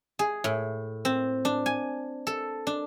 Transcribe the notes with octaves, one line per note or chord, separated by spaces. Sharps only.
G#4
A2
C4
D4
G#5
A4
D4